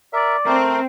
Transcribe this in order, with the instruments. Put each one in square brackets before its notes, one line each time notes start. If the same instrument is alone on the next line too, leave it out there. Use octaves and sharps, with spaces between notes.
[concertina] A#4 E5 [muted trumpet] D5
[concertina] A3 A#4 [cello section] C4